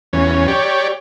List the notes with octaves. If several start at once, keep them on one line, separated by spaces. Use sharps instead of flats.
E2 C#4
G4 C#5 D5